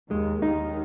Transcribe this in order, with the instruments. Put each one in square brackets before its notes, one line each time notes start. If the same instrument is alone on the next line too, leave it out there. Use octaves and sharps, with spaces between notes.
[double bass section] D#2 D#3 [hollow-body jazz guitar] G#3
[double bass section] D#2 D#3 [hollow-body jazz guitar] D#4